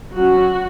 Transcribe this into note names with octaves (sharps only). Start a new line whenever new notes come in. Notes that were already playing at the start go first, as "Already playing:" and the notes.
F#3 C#4 F#4